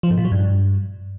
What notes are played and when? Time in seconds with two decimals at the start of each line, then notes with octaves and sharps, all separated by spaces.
0.03 F3
0.10 G#2
0.17 A#2
0.25 F#3
0.32 G2